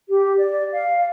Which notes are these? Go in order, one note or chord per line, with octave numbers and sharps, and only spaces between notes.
G4
D5
F5